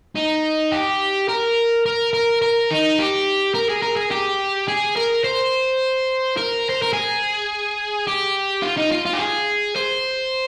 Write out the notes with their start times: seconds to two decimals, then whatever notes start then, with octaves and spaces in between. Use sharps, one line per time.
0.16 D#4
0.72 G4
1.28 A#4
1.86 A#4
2.13 A#4
2.42 A#4
2.71 D#4
2.99 G4
3.54 A#4
3.69 G#4
3.82 A#4
3.97 G#4
4.11 G4
4.68 G#4
4.96 A#4
5.24 C5
6.37 A#4
6.69 C5
6.82 A#4
6.93 G#4
8.07 G4
8.62 F4
8.77 D#4
8.92 F4
9.05 F4
9.13 G4
9.19 G#4
9.76 C5